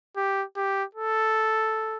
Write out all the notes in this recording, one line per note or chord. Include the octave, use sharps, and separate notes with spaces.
G4
G4
A4